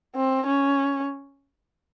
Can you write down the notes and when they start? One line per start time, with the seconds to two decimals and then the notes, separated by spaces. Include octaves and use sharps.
0.16 C4
0.47 C#4